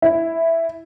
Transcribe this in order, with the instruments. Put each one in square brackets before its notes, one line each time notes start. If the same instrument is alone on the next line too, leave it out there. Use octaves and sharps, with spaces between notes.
[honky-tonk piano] E4